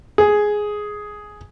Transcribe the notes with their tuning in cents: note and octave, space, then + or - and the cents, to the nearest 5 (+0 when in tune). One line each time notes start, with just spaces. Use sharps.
G#4 +5